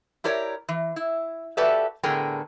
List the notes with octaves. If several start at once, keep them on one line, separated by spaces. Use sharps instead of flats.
E4 G4 A#4 C#5 D5
E3
E4
F#4 G4 A4 B4 D5 E5
A2 D3 B3 G#4 A#4 G5